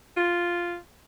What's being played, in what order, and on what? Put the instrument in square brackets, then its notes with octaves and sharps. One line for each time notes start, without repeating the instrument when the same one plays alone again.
[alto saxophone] F4